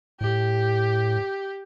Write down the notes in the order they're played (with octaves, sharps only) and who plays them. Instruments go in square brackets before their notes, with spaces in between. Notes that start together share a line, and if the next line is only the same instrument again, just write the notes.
[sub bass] A2 [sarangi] G4